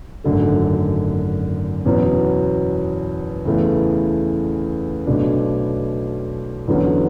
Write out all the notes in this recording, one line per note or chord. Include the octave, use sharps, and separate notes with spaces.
G#1 F#2 D3 A3
E2 B2 F#3 C#4
E2 C#3 E3 A3 E4
B1 B2 A3 D4
E2 D3 F#3 C#4